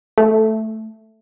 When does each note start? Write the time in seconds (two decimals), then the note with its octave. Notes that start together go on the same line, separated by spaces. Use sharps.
0.18 A3